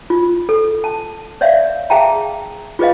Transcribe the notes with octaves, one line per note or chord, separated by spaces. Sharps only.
F4
A4
A5
C#5 D5 E5 F5
G#4 E5 F5 G5 A5 A#5
F4 G#4 B4 D#5 F5